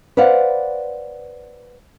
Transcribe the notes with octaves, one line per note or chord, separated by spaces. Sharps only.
B4 C5 D5 F5 F#5